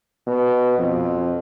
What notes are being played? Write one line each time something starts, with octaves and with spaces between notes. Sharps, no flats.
B2
F2